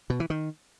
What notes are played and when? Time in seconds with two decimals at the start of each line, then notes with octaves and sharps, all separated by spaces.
0.10 B2
0.20 E3
0.30 D#3